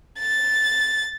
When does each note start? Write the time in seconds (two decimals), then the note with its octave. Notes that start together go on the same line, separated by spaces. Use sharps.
0.19 A6